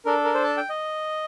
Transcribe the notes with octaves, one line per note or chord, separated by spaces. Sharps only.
D4 A4 A#4
A#4
C5
A5
G5
D#5